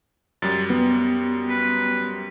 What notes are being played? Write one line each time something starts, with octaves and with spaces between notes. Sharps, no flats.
F#2 G3 A6
B3
B4